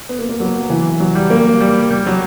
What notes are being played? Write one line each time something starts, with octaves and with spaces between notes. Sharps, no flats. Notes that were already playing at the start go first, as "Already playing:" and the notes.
B3
A#3
A#3
F#3
E3
F#3
G3
A#3
G3
G3
F#3